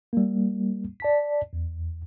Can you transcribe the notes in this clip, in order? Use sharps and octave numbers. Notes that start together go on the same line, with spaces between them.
G3 A#3
D5 A5 B6
E2